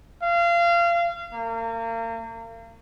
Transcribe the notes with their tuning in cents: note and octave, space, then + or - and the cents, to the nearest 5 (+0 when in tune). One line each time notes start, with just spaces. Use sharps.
F5 -30
A#3 -35